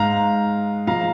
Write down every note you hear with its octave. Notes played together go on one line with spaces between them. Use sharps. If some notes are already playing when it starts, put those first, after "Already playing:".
Already playing: G#2 G#3 F5 A#5
A#2 F3 G#3 F5 A#5